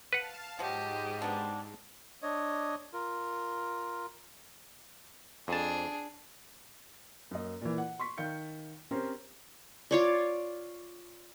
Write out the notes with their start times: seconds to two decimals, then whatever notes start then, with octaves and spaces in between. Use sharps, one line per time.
0.13 B4 F5 F#5 A5
0.59 G#2 F3 F#3 G4 D#5
1.22 B3 D4
2.22 D4 C#5 D#5
2.93 F4 A#4
5.48 F2 D4 G#4 A5
7.31 F#2 A#3 D#5
7.61 A#2 E3
7.78 F#5
7.99 C6 C#6 B6
8.18 D#3 F5 G6 C#7
8.91 C4 C#4 G4 A#4 C5
9.91 F4 C#5 D5